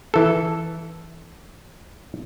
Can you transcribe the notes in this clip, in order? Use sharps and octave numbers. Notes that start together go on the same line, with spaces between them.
E3 A4